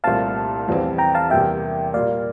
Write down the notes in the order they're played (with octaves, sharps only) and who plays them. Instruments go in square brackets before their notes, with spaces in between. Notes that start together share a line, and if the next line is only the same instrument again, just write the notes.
[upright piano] C2 A#2 A3 C4 [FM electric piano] F5 A5
[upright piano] F1 E2 E3 G3 C4
[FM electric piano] G5 A#5
F5 A5
[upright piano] E2 C3 G3 A#3 [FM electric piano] E5 G5
[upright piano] A#2 G3 A#3 [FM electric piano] D5 F5